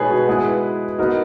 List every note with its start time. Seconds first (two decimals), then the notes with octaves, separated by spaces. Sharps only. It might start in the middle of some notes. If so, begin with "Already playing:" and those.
Already playing: B2 G#3 B3 D#4 G#4 B4 C#5
0.09 F#4
0.28 G#3 B3 E4 G#4 B4
0.98 B3 D#4 F#4 A#4